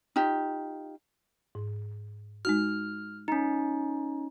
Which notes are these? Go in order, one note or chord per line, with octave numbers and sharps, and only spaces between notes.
D#4 F4 G4
G#2
G#3 D#4 F#4 F6
C#4 D#4 A#5